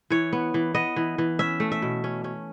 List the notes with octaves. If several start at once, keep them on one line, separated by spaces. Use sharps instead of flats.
E3 C#5
B3
E3
B3 D#5
E3
E3
C#4 E5
A3
E5
B2
C#4
C#4